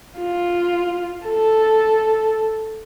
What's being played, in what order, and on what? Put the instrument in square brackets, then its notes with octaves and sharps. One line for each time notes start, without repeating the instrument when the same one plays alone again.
[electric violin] F4
A4